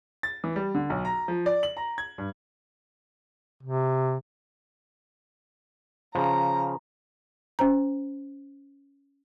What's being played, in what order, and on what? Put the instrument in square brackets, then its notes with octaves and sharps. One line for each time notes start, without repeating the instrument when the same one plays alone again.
[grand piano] A6
E3
G3
D3
B1
A#5
F3
D5
F#7
A#5
G#6
G2
[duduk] C3
[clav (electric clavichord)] C#3 F3 [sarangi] A#5
[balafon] C#4 C5 A#5